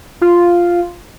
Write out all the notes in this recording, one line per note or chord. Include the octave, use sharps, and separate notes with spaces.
F4